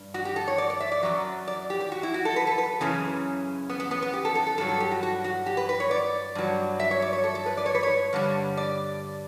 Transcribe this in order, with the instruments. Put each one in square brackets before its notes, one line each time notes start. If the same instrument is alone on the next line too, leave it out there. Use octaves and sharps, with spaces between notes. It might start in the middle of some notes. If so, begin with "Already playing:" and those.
Already playing: [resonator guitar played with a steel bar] G2
F#4
G4
A4
C#5
D5
D5
E5
D5
F#2 C#3 F#3
D5
G4
G4
F#4
E4
F#4
A4
B4
A4
B4
F#2 C#3 E3 C#4
B3
B3
B3
B3
G4
A4
A4
A4
G2 A4
F#3
A4
G4
F#4
F#4
F#4
G4
B4
B4
C#5
D5
G2 F#3
E5
C#5
D5
C#5
A4
A4
B4
D5
C#5
B4
C#5
G2 D3 G3
D5